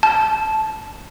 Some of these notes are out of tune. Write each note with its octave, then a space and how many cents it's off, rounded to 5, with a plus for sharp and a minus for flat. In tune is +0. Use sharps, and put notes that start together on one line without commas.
A5 -10